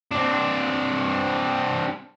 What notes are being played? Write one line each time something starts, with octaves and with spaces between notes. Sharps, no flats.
C4 D4